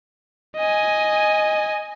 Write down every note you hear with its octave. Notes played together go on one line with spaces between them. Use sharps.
D#5 G#5